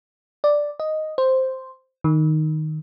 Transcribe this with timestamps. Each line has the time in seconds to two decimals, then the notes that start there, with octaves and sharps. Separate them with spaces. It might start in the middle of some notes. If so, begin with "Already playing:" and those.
0.44 D5
0.80 D#5
1.18 C5
2.04 D#3